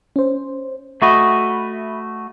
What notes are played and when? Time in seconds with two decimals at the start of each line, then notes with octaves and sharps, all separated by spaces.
0.16 C#4 C5
1.02 A3 F#4 D#5 E5 B5